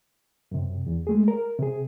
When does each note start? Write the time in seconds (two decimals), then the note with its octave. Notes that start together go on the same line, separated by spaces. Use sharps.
0.52 F#2 C3
0.87 E2
1.07 G#3 A3 G#4
1.28 A#4
1.59 C3 G#4